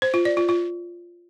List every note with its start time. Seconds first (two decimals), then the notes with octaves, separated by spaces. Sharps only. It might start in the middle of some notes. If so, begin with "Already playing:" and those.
0.02 C5
0.14 F4
0.25 D5
0.37 F4
0.49 F4